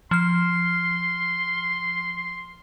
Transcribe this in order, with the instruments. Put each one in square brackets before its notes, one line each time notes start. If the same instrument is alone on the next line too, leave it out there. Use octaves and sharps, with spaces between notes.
[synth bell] F3 F6 [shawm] C6